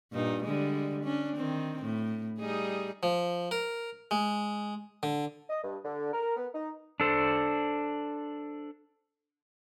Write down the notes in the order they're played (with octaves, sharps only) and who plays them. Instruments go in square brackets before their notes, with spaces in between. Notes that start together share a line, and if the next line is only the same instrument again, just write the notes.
[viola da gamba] G2 A#2 D#4
D3 G3 G#3
C#4 D4
D#3 C4
A2
G3 D#4 G#4
[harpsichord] F3
A#4
G#3
D3
[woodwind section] D#5
G2
D3
A#4
B3
D#4
[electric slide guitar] D4 A4 C5